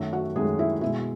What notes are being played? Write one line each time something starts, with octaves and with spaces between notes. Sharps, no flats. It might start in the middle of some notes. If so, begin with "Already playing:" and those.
Already playing: F#2 D#3 A3
F#4 F#5
F#2 D#3 G#3 A3 G#4
E4
B2 G#3 E4